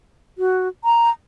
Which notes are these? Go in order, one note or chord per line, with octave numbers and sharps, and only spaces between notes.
F#4
A#5